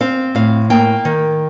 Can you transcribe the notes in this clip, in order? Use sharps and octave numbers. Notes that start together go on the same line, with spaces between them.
C4 F5
A2 F5
A#3 G5
D#3